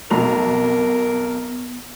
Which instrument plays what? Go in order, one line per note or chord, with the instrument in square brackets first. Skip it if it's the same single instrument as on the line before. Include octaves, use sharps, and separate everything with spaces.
[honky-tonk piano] B1 F2 F7 [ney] B3 [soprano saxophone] A#4